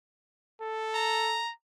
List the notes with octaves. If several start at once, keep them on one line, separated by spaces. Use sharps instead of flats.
A4
A#5